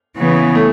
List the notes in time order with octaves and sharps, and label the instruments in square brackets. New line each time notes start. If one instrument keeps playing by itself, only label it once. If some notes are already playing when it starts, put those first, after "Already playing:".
[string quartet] C#3 E3 B3
[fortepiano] A3